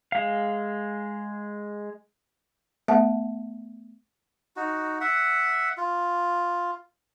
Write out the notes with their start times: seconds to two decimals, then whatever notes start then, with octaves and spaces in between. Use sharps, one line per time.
0.12 G#3 F5
2.88 A3 B3 E5 F#5 A5
4.56 D#4 F#4
5.01 E5 F#5
5.77 F4